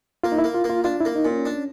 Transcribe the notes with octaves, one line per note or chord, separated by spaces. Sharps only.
A#3 F4
D#4
E4
A#3
F4
A#3
F4
D4 F4
A#3 E4
D#4
A#2
C#4
D4